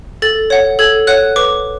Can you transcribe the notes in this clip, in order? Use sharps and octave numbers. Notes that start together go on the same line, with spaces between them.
A4 A6
C#5 F#5
A4 G#6
C#5 F#5 F#6
B4 D6